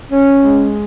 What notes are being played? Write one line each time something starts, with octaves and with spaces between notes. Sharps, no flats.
C#4
G#3